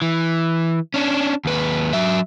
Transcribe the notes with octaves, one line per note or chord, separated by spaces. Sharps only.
E3
C#4 D4
D#2 B4
F#3 E5